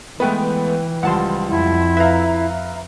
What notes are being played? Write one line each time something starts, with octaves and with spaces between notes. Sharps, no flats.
E3 G#3 A3 B3 B4 G5
C#2 F3 G3 F#5 A5 C6
F2 E4
B4 E5 F5 A#5